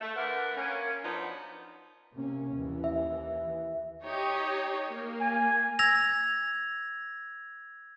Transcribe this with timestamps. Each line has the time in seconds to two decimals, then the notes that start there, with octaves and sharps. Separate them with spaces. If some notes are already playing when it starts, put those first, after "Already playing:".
0.01 A3
0.16 D3 A3 A#4 B4 F#5
0.57 A#3 C#4
1.04 F3 F#3 B3 D4 D#4
2.13 C3 A#3 C#4
2.53 D#2 E3
2.84 E5
4.02 D#4 G4 C#5
4.91 A#3
5.21 G#5
5.79 E6 G#6 A#6 F7